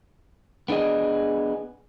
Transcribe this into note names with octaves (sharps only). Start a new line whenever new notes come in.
B3 D4 G#4 D#5